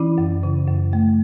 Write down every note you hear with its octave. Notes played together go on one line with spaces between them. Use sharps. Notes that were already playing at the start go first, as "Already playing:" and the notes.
Already playing: E3 C#4 E4
F#2
C#3
F#2
A3